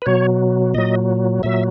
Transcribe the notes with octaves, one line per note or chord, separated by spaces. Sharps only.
B4
B2 F#3 C#5
A#2 F#3 D#5
A#2 F#3 E5